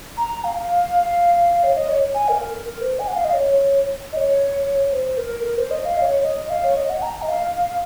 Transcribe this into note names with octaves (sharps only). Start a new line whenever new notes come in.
A#5
F5
C#5
D#5
C#5
G#5
A#4
A#4
C5
G#5
F#5
F5
D#5
C#5
D#5
C#5
C5
A#4
A#4
C5
D#5
F5
D#5
C#5
D#5
F5
C#5
D#5
F#5
A#5
D#5
F5